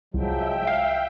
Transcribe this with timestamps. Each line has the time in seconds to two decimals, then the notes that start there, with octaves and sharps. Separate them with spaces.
0.14 C2 F3 F#3 G#3 E5 G5
0.67 F5 F#5